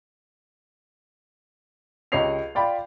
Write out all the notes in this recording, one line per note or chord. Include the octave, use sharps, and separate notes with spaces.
C#2 G4 C#5 D#5 C7 F7
F4 D5 G5 B5